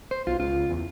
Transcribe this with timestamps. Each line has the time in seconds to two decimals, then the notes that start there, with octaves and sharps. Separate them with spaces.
0.11 C5
0.27 B1 F4
0.40 C#2 F4
0.69 E2